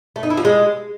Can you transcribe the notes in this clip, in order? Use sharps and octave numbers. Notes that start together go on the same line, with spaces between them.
A3
D#4
E4
F3
G#3